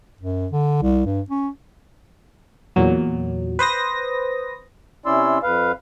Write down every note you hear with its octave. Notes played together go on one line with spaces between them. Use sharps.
F#2
D3
C2
G2
C#4
E2 A#2 F#3
B4 C5 D#6 A#6
C3 C#4 E4 D5 C6 E6
F2 B4 F5